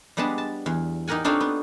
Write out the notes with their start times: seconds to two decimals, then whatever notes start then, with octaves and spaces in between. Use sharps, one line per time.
0.17 G3 G#3 B3 D4 A5
0.38 A5
0.66 E2
1.08 D#4 G4 A#4 F#5 G#5
1.24 C4 D4 D#4 F4 A4 C#5
1.40 B3